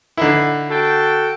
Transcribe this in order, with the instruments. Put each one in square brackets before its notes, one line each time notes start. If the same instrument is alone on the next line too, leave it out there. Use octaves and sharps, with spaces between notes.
[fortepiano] D3 D#4 E4
[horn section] F#4 A4 G5